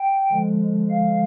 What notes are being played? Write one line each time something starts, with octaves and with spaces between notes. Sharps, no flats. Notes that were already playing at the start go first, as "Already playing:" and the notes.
Already playing: G5
D3 F3 G#3
F5